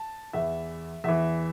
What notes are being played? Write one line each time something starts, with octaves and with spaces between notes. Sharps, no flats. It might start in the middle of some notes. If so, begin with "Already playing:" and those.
Already playing: A5
E2 E3 E5
E2 E3 E5